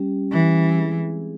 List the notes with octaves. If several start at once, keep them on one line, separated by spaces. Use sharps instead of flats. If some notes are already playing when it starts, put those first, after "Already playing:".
Already playing: G3 C#4 G4
E3 G3 C#4 G4
G#3 C4 E4 G#4